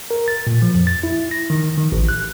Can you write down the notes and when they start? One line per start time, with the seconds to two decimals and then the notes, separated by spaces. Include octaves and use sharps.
0.11 A#4
0.28 A6
0.47 A#2
0.62 F3
0.75 F2
0.87 A6
1.03 E4
1.31 A#6
1.50 D#3
1.77 D#3
1.92 A1
2.09 F#6